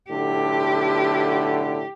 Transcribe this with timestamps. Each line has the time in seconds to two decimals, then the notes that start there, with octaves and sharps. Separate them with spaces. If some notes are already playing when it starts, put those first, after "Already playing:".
0.11 B1 A2 D3 G4